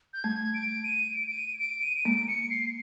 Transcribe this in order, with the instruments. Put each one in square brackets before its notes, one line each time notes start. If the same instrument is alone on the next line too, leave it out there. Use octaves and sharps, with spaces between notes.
[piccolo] G6
[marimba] G3 A3 [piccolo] G#6
[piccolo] D7
D#7
D7
D7
D#7
D7
D#7
D#7
[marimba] G#3 A#3 [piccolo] D7
[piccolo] C#7
C7